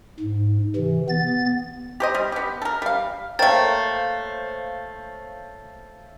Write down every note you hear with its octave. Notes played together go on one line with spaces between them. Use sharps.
G#2
C3 E3
B3 A6
G4 C5 D#5
G3
B3 G4
A4 A#4
G3 F5
A3 A#3 C5 C#5 F5 G5 A6